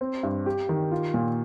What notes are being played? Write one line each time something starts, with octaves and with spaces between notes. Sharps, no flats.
C4
G2
G4
D#3
F4
A#2